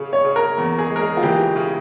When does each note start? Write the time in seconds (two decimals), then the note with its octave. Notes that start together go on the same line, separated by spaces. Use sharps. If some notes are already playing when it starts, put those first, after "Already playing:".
Already playing: C#3
0.13 C#5
0.25 C#3
0.36 A#4
0.58 E2
0.79 G#4
0.90 G#3
0.96 A#4
1.02 G#4
1.17 F4
1.23 E3 G4
1.56 C#3